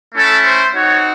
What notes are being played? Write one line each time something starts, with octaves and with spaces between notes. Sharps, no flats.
A3 C#4 E4 A4
C5
C4 D#4 F#4 C#5